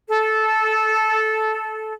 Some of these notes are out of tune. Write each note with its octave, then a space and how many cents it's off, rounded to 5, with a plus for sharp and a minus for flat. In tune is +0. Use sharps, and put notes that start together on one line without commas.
A4 -15